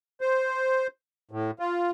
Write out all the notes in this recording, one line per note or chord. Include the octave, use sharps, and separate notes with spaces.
C5
A2
F4